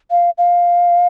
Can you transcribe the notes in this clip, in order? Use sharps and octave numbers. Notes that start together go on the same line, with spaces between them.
F5
F5